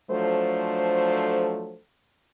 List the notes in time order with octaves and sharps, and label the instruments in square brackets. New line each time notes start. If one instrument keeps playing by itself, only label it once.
[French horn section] F3 F#3 A3 D4 A4 C5